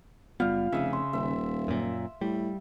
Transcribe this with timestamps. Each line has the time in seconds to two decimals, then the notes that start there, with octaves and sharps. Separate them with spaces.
0.40 F#1 G3 B3 F4 F5
0.73 F1 C#3 D#5 E5
0.93 C6
1.13 D#1 E5
1.68 F#2 A#2
2.21 A2 G3